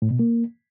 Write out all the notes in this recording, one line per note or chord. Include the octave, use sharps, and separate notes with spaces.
A2
B2
A#3